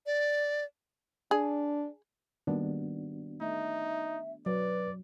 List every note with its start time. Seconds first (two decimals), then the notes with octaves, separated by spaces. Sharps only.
0.06 D5
1.31 D4 G#4
2.47 D#3 G3 A#3 B3 D4 F#4
3.41 A3 D#4 E5
4.46 F#3 B4 D5